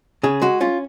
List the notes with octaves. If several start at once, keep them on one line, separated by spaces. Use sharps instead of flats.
C#3 G#4
G#3 F#4
C#4 F4